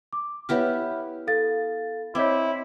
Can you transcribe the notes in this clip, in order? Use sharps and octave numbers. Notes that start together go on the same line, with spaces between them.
D6
B3 E4 G4 C#5 E5 F6
A4 F5 A6
C4 E4 C#5 D#5 D6